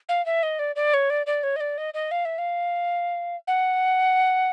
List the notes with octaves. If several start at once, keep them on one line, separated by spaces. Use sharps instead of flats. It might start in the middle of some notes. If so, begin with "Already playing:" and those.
F5
E5
D#5
D5
D5
C#5
D5
D5
C#5
D#5
D5
D#5
D#5
F5
E5
F5
F#5